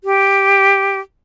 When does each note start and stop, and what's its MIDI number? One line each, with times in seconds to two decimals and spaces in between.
0.04 0.99 67